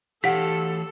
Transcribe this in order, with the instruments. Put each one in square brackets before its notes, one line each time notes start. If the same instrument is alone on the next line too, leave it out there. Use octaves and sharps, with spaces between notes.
[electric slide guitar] E3 C#5 F5 [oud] G4 [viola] A4 [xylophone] F#5 B6